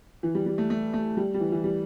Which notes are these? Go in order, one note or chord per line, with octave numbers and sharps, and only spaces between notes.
E3
G3
G3
A3
A3
A3
G3
G3
E3
E3
G3